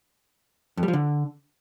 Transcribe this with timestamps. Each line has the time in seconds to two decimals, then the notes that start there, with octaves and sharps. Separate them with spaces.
0.77 F2
0.83 G3
0.88 F3
0.93 D3